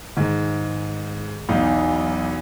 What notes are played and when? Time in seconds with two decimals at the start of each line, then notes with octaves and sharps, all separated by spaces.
0.17 G#2 D#3 G#3
1.49 B1 E2 D#4 F5